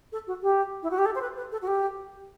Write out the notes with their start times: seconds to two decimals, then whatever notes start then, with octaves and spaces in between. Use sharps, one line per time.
0.12 A4
0.27 F#4
0.42 G4
0.83 E4
0.91 F#4
0.98 G4
1.06 A4
1.15 C5
1.21 B4
1.37 B4
1.52 A4
1.62 F#4
1.67 G4